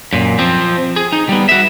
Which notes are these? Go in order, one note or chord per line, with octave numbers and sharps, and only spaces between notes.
F#2 A#2
F3 C4
G#4
D#4
G3 B3
F#4 E5